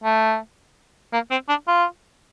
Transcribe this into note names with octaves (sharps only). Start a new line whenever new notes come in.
A3
A#3
C4
D4
F4